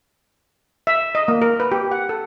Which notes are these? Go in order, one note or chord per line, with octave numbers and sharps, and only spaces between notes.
E5
D#5
A#3
A#4
B4
G4
F#5
A4